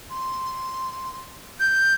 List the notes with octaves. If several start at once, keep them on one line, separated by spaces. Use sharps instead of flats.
C6
G6